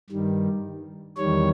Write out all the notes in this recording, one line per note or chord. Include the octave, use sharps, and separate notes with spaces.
G2 D#3 G3
E2 D#3 G3 C#5